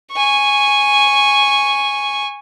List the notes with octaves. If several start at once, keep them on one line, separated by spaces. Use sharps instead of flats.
G#5 C#6